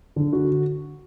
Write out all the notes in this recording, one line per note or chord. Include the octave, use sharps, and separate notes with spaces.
D3
F#4